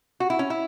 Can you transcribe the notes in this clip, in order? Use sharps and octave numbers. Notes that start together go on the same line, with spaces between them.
F#4
E4
C#4
E4